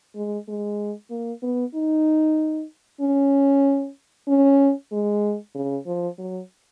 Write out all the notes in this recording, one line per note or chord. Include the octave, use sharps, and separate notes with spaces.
G#3
G#3
A#3
B3
D#4
C#4
C#4
G#3
C#3
F3
F#3